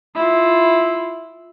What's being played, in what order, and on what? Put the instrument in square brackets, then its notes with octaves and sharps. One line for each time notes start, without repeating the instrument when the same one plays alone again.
[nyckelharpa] E4 F4